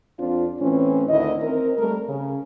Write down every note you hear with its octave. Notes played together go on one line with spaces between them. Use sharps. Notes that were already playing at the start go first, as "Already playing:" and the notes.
F2 C4 D4 F4
A2 E3 C4 C#4
D2 D#3 E4 D#5
C4 A#4
G3 A3 A#4
C#3